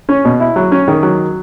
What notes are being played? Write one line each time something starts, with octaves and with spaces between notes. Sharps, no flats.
C#4
B2
E4
F#3
C#4
D#3
F#3